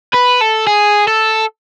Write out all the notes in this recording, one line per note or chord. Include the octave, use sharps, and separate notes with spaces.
B4
A4
G#4
A4